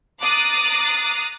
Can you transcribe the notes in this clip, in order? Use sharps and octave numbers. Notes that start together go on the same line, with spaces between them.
A#5 D6 D#6 F#6 A6 C7